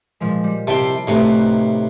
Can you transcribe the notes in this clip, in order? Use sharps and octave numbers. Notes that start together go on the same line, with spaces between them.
A#2 F3 G#3
G3
C3 E4 F5 G5 A5
A2 C3 D#4 F#4 B4